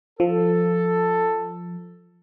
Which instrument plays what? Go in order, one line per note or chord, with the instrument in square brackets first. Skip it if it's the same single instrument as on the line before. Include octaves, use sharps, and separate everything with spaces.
[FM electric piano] F3 [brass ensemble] A4